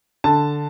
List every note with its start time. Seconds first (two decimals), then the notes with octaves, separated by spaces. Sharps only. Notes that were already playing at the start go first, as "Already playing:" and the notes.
0.24 D3 A5